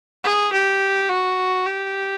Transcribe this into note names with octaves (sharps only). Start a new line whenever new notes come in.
G#4
G4
F#4
G4